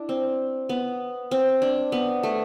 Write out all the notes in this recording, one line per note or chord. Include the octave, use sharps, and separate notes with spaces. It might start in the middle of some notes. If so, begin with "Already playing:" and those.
Already playing: D4 E4
C4
B3
C4
D4
B3
A3